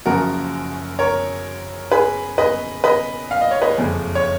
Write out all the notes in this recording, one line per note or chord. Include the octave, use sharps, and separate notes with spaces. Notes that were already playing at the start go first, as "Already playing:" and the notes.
F#1 F#2 C#3 F3 A#3 F#4 A#4
A#4 C#5
G#4 B4
B4 D#5
B4 D#5
F5
D#5
C#5
B4 D#5
F#1 F2 F3 G#3
C#5